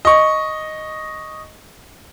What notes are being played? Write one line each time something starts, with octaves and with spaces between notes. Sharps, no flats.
D#5 C#6